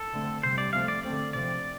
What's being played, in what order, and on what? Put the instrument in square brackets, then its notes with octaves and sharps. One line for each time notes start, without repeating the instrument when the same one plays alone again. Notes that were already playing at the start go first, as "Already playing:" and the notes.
Already playing: [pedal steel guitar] A4
[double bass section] D3 A3 C4
[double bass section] C3 G3 C4 [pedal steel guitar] C5
[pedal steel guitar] D5
[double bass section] C3 F3 A3 C4 [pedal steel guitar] F5
[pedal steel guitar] D5
[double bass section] D3 A3 C4 [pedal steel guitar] D5
[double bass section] C3 F3 C4 [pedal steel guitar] D5